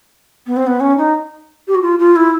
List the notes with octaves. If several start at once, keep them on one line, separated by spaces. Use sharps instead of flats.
B3
C4
B3
C#4
D#4
G4
F#4
F4
F4
E4